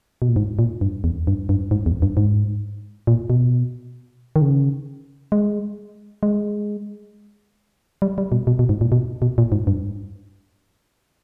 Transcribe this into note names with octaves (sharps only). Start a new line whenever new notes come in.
B2
A#2
G#2
A#2
G2
E2
G2
G2
G#2
E2
G2
G#2
A#2
B2
D#3
C#3
G#3
G#3
G3
G3
B2
B2
B2
G#2
A#2
B2
B2
A#2
G#2
G2